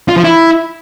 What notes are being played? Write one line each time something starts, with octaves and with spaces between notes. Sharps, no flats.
F4
F3
E4